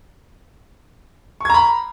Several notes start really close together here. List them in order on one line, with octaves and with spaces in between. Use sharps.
C#6 G#6 A#5 B5